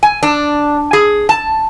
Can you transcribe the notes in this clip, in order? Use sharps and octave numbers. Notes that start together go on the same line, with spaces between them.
G#5
D4
G#4
A5